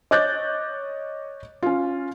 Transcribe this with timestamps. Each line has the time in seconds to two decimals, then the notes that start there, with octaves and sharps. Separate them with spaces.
0.11 C#5 D#5 D6 F#6 G6 A6
1.63 C#4 F4